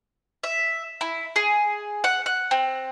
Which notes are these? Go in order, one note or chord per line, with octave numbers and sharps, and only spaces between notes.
E5
E4
G#4
F#5
F#5
C4